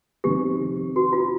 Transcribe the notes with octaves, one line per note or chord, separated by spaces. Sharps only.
F2 C3 D#3 G4
F#4
F4